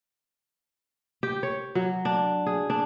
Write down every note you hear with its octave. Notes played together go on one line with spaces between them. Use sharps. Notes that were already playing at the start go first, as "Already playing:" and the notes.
G4
C#5
F#3
D4
G#4
D4